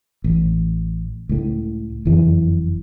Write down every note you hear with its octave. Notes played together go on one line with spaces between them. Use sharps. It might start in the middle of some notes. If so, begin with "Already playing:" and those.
A1
C#2 A2
F#1 F2 E3